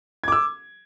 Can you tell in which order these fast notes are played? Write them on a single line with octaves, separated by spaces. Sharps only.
G#6 D6 E6